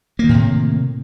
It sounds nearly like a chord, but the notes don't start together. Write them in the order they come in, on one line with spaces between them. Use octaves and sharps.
A#3 D#3 A2 C3